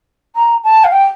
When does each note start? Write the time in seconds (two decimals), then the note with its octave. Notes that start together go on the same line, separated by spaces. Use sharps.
0.36 A#5
0.64 A5
0.84 F5
0.92 G5